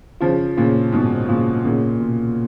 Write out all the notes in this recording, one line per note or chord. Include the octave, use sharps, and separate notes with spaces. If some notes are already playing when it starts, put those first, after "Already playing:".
C#3 F3 F4
A#2 C#3 F4
G#2 B2 F#3
A#2 C#3 F4
A#2 C#3 A#3
B2